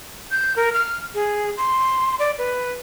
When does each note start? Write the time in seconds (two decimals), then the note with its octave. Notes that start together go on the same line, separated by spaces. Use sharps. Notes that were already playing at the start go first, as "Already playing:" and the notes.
0.31 G6
0.56 A#4
0.74 F6
1.14 G#4
1.57 C6
2.19 D5
2.38 B4